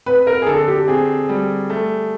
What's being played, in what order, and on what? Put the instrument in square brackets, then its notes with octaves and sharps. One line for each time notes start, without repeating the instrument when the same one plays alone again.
[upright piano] C4 [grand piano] B4
[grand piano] A#4
G#4
[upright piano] D3 [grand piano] A4
[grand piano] G4
[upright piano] C4 [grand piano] G#4
[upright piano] G3
A3